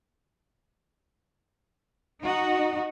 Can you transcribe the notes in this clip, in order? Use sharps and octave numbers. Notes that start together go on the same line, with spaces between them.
D#4 F#4 D#5